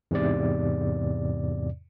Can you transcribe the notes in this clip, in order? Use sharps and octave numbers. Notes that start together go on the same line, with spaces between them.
E2 G#2 C3 D5